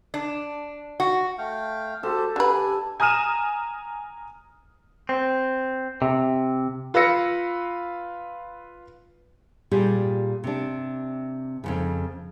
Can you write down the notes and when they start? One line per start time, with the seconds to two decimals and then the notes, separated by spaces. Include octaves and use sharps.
0.14 D4
1.00 F#4
1.38 A3 F5 G5
2.03 F#4 G4 A4 C5
2.36 D3 G4 B4 G#5
3.00 G#5 A#5 D#6 F6 D#7 E7
5.09 C4
6.02 C3
6.94 F4 B4 F5 E6 A#6 C#7
9.71 A#2 G3 G4 G#4
10.44 C3 D4
11.64 F2 A#2 C#3